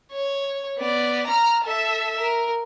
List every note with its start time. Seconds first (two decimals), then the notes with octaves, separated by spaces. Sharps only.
0.13 C#5
0.79 B3 D5
1.27 A#5 F6
1.64 A4 E5
2.20 A#4